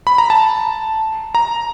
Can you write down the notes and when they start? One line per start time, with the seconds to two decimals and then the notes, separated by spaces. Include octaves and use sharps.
0.07 B5
0.18 A#5
0.30 A5
1.35 A#5